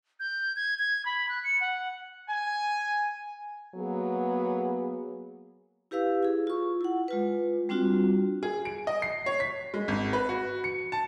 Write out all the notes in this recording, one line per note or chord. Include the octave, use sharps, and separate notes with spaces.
G6
G#6
G#6
B5
F#6
C#7
F#5
G#5
F#3 A#3 B3 G#4
E4 G4 B4 F5 E6
E4 G#4
F4 C#6
E4 F#5
G#3 F4 B4
G3 C4 D4 F4 F#4
G#4
D7
D#5
C7
C#5
B6
G#3
G#1
B4
F#4
C#7
A5